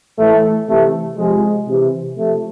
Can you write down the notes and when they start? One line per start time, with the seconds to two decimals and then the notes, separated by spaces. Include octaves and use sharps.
0.18 A2 E3 A3
0.67 C3 E3 A3
1.18 C3 F3 G#3
1.67 C3 E3
2.16 C3 F3 A3